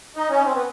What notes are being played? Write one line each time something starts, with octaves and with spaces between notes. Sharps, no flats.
D#4
C#4
C4
B3